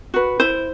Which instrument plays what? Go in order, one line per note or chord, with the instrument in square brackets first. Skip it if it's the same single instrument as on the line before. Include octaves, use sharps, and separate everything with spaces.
[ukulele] F#4 B4
E4 C5